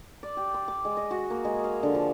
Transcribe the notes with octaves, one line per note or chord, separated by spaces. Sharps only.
D5
G4
C6
D6
G#3
D#5
F#4
A#3
G#3
F5
D3
F3